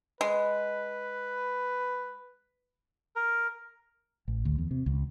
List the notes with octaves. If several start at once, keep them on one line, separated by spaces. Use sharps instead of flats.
G#3 B4
A#4
A1
D2
E2
C3
C#2